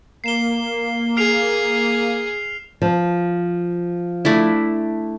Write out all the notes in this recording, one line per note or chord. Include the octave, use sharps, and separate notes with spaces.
A#3 C7 E7 G7
G#4 F6 C7 F7
F3
A3 D4 E4